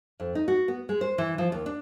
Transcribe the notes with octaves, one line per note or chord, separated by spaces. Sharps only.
F2
D#4
F#4
B3
G#3
C5
E3
F3
D#2
D4